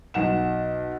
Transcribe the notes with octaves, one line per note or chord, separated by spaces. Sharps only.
B1 F#5 E7